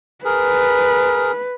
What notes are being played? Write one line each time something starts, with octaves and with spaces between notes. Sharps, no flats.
G#4 A#4 B4